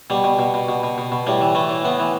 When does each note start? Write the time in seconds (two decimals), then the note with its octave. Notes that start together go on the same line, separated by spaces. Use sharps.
0.10 B2 G3
0.24 B2
0.39 B2
0.54 B2
0.69 B2
0.83 B2
0.98 B2
1.12 B2
1.27 A2 G3
1.41 E3
1.55 E3 A3
1.69 A2
1.85 A2 B3
2.00 E3